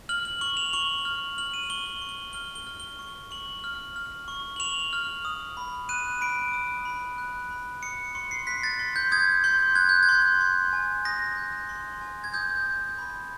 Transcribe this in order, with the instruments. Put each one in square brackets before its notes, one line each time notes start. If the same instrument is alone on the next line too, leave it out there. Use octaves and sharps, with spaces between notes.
[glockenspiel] F6 F#7
F#7
C#6 F#7
F7
C#6 F#7
F6
F6 F#7
D#7
C#6 G7
G7
C#6
G7
F6 G7
G7
F6
G7
C#6
C#6 F#7
F6
F6
C#6
F#7
C#6 F7
F6
D#6
B5
F#6 D#7
B5 D7
D#6
B5
F#6
B5
D#6 C#7
C6 C#7
C7
F#6 B6
A6
C6
G6
D#6 G#6
C6 G6
F#6 G#6
G6
G#6
C6
C6
G#5
D#6 A#6
G6
C6
G#5
G#6
D#6 G6
G6
B5